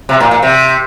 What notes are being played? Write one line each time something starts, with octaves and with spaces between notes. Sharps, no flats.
C3
A#2
A#2
C3